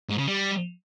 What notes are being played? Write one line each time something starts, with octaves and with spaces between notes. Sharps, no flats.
G#2
C#3
G3